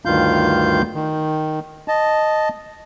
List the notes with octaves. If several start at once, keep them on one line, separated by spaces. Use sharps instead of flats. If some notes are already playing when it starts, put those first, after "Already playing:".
D2 G2 D#3 F4 F5 G6
D#3
D#5 A5